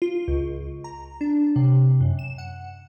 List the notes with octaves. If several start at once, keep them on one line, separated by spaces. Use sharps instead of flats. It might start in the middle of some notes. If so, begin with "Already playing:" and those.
F4
C#2
A#5
D4
C3
F#2
E7
F#5